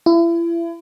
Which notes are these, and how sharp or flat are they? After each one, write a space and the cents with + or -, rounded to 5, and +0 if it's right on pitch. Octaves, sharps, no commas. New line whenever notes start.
E4 +35